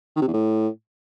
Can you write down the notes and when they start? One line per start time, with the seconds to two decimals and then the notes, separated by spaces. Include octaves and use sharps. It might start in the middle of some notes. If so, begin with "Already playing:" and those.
0.16 D#3
0.22 C3
0.27 E2
0.33 A2